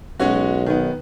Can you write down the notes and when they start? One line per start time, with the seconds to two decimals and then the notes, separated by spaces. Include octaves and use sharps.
0.20 B1 G#3 C#4 F#4
0.66 D#3 B3